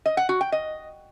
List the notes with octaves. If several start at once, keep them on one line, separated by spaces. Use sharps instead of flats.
D#5
F#5
F#4
G5
D#5